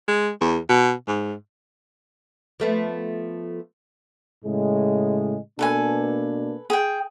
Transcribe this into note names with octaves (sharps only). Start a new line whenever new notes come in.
G#3
E2
B2
G#2
F3 A3 B3
A2 C#3 G#3
B2 A#3 D4 A4 B4 G#5
G#4 G5